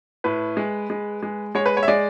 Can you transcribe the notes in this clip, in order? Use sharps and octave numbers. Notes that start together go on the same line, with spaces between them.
A2 B4
G#3
G#3
G#3
G#3 C#5
B4
C#5
E5
G#3 D5